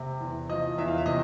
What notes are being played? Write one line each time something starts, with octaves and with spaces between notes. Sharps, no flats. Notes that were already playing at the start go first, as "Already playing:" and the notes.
Already playing: C3
E2
F3 D#5
E2 E5
F5
E5
C3 D#5